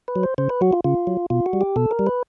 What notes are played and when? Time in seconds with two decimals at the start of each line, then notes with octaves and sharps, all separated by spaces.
0.08 B4
0.16 F#3
0.23 C5
0.38 C#3 C5
0.49 B4
0.61 F#3 F#4
0.73 F4
0.84 C#3 F4
1.07 F#3
1.30 B2 F4
1.46 F#4
1.53 G3
1.61 G4
1.76 B2 A4
1.91 A#4
1.99 G3
2.07 B4